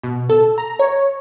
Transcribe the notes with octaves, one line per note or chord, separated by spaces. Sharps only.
B2
A4
A#5
C#5